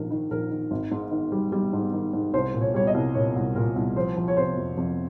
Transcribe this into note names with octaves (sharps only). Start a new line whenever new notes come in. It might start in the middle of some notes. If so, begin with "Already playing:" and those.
Already playing: A#1 G#2 D#3 A#4
D#3
A#1 A#4
D#3
G#1
G#2
D#3
G3
G3
G#2
D#3
G#2
C2 C5
A#2
C#5
G3 C#5
D#5
C2
A#2 C#5
C2
A#2 A#4
C2
F3 C5
F3
C#5
C3 C5
F2
F2